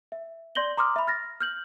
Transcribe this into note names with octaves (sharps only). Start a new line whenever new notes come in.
E5
D5 C6 G6 A#6 F#7 G7
A#5 C6 D6 D#6 F6
E5 B5
F6 A6 A#6
F6 G6 F#7